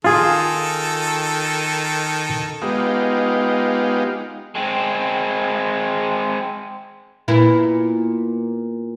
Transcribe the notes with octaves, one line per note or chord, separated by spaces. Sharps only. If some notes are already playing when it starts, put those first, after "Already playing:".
D#3 F4 G#4 A4
G#3 B3 D#4 F4 G4
G#3 C4 G#4
A#2 B3 E4